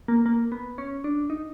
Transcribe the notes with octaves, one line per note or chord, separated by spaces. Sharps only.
A#3
A#3
B3
C#4
D4
D#4